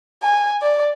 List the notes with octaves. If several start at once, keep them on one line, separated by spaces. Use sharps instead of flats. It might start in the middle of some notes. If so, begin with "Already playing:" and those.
G#5
D5